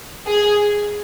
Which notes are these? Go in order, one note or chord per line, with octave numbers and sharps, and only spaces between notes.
G#4